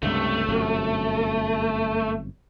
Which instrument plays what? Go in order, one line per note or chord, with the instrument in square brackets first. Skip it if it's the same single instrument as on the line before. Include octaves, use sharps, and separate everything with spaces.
[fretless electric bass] C#2 G2 C3 [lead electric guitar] A3
[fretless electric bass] G1 F#2 C3